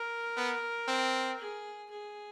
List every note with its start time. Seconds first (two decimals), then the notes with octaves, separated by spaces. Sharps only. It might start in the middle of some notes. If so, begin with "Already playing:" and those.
Already playing: A#4
0.37 B3
0.88 C4
1.39 G#4
1.90 G#4